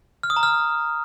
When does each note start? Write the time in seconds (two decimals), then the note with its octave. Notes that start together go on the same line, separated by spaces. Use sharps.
0.23 F6
0.30 D#6
0.36 A#5
0.43 F6